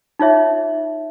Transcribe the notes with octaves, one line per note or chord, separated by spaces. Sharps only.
D#4 F4 C#5 E5